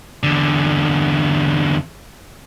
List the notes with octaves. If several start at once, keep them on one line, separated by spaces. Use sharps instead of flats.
E2 D3